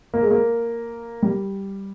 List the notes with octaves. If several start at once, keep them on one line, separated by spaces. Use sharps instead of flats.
A#3
G#3
A#3
G3